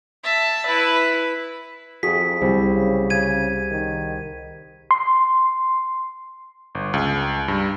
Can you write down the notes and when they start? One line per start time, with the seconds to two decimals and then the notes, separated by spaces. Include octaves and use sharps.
0.24 E5 A5
0.66 E4 B4
2.03 F2 F#4 G#4 B6
2.41 C2 C4
2.74 C#3
3.10 C#3 G#6 D#7
3.71 D#3
4.91 C6
6.75 G1
6.94 C#2
7.48 G2